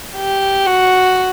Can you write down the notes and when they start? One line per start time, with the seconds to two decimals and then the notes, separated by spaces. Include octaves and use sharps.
0.16 G4
0.66 F#4